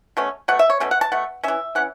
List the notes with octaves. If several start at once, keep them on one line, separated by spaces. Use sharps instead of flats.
B2 A3 C#4
B2 A3 F#5
E5
C#5
B2 A3 C#4
F#5
A5
B2 A3 F#5
E3 C#4 E5
E3 C#4 F#5